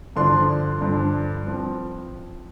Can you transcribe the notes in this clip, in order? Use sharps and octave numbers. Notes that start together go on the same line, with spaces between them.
G2 D3 F3 D4 C6
G2 D3 F3 D4
F3 C4